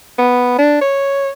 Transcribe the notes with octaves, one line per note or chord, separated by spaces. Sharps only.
B3
D4
C#5